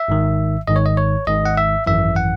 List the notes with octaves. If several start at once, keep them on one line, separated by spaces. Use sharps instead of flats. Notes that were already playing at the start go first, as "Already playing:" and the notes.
Already playing: E5
G#1 G#2 D#3
G#1 G#2 D#3 D#5
C#5
D#5
C#5
G#1 G#2 D#3 D#5
F#5
E5
G#1 F#2 E3 E5
F#5